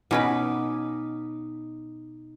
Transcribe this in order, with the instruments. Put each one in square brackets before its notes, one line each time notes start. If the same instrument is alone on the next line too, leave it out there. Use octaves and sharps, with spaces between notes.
[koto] B2 C#4 B4 [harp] D#4 D6